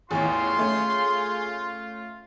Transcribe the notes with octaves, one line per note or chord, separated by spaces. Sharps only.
A1 E2 F4 G#4 C#5 C6
A3 C#4